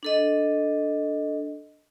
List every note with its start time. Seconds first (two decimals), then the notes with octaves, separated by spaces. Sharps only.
0.03 D4 A4 D#5